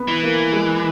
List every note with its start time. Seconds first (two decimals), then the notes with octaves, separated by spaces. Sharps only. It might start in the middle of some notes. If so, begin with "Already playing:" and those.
Already playing: B3
0.08 E3
0.23 A#3
0.53 G#3